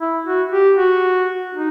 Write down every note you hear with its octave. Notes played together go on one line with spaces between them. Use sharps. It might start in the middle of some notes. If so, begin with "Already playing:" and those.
E4
F#4
G4
F#4
D#4